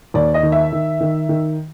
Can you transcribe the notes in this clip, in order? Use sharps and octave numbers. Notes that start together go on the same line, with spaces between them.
D#2 D5
D#5
D#3
E5
D#3
D#3
D#3